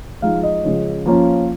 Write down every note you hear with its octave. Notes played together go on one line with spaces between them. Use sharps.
F3 G#3 D#4 F5
D#5
C#3 F3 G#3 C#4
F3 A#3 C#4